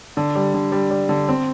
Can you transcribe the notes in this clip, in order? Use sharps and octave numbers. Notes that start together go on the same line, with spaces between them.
D3
G3
D3
G3
G3
D3
C4